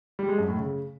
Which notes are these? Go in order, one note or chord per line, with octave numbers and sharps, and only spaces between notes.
G3
G#3
F#2
A2
C#3